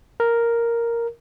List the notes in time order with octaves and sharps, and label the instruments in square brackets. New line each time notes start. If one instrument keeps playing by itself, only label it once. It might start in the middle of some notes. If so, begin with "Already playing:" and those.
[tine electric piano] A#4